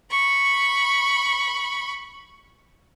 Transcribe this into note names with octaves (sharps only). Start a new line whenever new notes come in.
B5 C#6